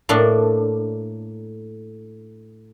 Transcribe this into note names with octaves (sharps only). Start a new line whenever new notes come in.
A2 A#3 D4